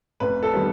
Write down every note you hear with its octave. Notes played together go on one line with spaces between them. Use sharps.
F1 B4
A4
D#3 G3 B3